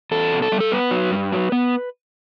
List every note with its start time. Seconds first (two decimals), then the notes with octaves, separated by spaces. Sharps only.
0.11 E2 A4
0.32 B2
0.42 A4
0.52 G3
0.60 A4
0.72 B3 B4
0.91 F#3
1.11 G2
1.32 F#3
1.52 B3